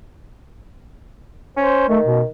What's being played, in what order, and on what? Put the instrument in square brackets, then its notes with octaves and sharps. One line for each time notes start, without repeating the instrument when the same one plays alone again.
[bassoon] C#4 [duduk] C5
[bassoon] D#3 [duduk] A3
[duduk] B2